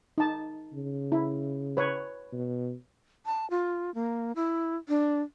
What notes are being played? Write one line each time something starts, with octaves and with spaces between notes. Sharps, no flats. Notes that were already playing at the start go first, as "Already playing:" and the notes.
D#4 A5
C#3
E4
B4 C#5
B2
A5
F4
A#3
E4
D4